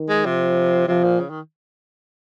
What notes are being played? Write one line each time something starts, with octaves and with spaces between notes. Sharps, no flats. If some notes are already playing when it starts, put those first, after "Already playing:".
Already playing: D#3
G#3
C3 F3
C3 F3
A#2
C#3
D#3